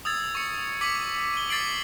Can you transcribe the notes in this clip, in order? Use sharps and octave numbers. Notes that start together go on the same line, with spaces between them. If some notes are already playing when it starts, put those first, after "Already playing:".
D#6 E6 G#6 A6
C#6 C#7
D6 B6 C#7 D#7 F#7
D#7 G7
D6 A6 C7 D7 F#7